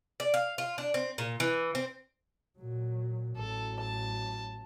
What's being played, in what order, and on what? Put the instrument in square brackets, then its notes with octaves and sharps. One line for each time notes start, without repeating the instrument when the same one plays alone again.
[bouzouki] D5
F5
F4
D4
C4
A#2
E3
C4
[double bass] A#2 F#3
[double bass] A1 F#3 [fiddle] A4
[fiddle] A5